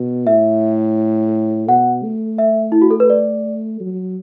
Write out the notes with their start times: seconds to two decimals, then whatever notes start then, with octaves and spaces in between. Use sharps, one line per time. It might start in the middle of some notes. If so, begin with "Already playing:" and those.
Already playing: B2
0.27 A2 E5
1.68 B2 F#5
2.03 A3
2.38 E5
2.72 E4
2.82 F#4
2.91 A4
3.00 B4
3.10 D5
3.80 F#3